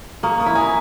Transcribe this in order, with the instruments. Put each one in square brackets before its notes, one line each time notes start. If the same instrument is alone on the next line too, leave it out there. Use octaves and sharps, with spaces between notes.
[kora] A#3 [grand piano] C#6 D#6
[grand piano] C#6 D#6
[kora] E4
[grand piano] G#5 A#5